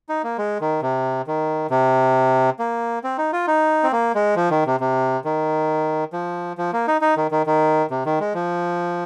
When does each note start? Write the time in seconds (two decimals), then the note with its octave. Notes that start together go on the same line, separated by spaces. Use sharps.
0.09 D#4
0.24 A#3
0.38 G#3
0.61 D#3
0.82 C3
1.27 D#3
1.70 C3
2.59 A#3
3.04 C4
3.18 D#4
3.33 F4
3.47 D#4
3.83 C4
3.92 A#3
4.15 G#3
4.36 F3
4.51 D#3
4.66 C3
4.80 C3
5.25 D#3
6.13 F3
6.58 F3
6.73 A#3
6.87 D#4
7.01 D#4
7.17 D#3
7.31 D#3
7.46 D#3
7.90 C3
8.06 D#3
8.20 G#3
8.34 F3